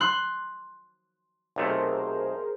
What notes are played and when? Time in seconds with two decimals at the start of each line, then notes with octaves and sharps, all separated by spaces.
0.01 C6 F#6
1.56 B1 C3 A3 G#4 A#4 C5